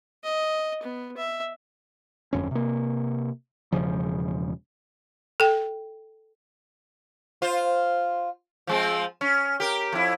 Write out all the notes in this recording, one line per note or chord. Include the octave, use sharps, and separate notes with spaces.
D#5
B3
E5
G1 F2 C#4
C3 A#3
E1 A#1 C#3 F3
A4 G5
F4 C5
F3 G#3 C4
C#4
G4 A#4
F2 E4